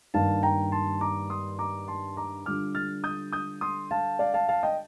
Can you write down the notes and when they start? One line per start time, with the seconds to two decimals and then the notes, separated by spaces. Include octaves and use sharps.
0.14 G2 D#3 A#3 F5 A5
0.43 G5 A#5
0.72 A5 C6
1.01 A#5 D6
1.30 C6 D#6
1.59 A#5 D6
1.88 A5 C6
2.17 A#5 D6
2.46 D3 G3 D4 F4 D6 F6
2.75 F6 A6
3.04 D#6 G6
3.32 D#6 G6
3.61 C6 D#6
3.91 F5 A5
4.19 D5 F5
4.34 F5 A5
4.49 F5 A5
4.63 D#5 G5